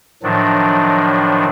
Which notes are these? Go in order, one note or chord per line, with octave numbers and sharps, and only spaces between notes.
A2 D#3 F3 F#3 D4